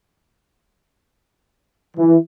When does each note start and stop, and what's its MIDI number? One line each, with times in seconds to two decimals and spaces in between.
1.97 2.16 52